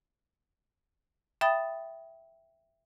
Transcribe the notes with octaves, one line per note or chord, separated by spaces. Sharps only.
E5 G5 B5 D#6 A6